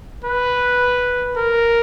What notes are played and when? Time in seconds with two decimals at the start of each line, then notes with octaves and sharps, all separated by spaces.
0.24 B4
1.36 A#4